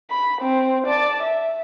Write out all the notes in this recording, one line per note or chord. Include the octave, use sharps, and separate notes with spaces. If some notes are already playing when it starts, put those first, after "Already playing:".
B5
C4
D5 A5
E5